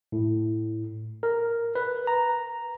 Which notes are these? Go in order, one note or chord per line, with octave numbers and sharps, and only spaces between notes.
A2
A#4
B4
A#5